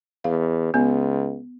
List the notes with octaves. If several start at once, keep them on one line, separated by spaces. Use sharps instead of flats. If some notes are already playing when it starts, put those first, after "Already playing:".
E2 F5
C#2 B3